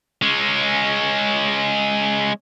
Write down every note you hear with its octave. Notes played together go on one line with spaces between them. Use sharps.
G#3 C#4